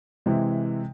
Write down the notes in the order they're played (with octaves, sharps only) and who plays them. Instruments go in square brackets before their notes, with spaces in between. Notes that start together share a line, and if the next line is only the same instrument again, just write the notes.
[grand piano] C3 E3 G#3